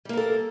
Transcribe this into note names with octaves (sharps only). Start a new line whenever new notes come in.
G3 A#3 A4 A#4